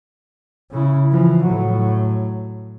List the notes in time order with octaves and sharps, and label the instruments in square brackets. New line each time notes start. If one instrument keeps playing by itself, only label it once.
[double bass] C#3 E4
E3 F3
A2 F#3